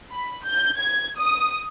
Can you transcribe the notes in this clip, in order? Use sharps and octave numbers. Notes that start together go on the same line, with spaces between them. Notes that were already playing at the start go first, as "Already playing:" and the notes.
B5
G6
G#6
D#6